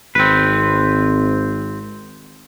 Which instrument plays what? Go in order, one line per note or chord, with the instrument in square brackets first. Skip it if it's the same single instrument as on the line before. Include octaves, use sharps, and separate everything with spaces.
[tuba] G#1 [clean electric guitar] C4 B4